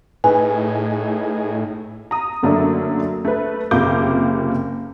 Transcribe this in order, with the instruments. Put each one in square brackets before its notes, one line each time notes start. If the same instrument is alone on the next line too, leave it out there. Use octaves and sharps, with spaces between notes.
[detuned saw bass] A2 [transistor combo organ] D#4 G#4 [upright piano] B4 [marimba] G#5
[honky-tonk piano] A#5 D#6
F#2 D3 F#3 A3 A#3 D4
A3 B4
F#1 C3 A#3 F4 D6 G6